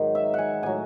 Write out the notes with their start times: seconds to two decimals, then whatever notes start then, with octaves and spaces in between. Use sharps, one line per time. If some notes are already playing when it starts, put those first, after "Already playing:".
Already playing: G#2 D#3 F#3
0.15 E5
0.34 F#5 G#5
0.63 A2 F#3 G#5